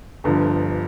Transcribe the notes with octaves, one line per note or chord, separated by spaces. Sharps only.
G1 G2 D3 F3